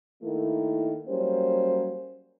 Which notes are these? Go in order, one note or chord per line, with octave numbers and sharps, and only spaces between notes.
D#3 A3 A#3 E4
F#3 G3 A#3 C#4 C5